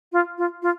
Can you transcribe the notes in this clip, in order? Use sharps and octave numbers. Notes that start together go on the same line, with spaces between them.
F4
F4
F4